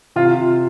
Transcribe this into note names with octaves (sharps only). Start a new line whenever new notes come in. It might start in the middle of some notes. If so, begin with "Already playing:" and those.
C3 F4